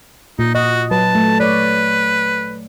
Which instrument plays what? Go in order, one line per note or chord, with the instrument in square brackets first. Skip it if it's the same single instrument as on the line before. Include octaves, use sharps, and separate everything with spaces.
[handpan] A#2 [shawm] D#4
[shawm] F#4 [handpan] D#5
[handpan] F#3 B4 [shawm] A5
[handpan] A3
[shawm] B4 [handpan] C#5 D5